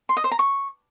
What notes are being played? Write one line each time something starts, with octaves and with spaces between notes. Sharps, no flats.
C6
D#5
C5
A#5
C#6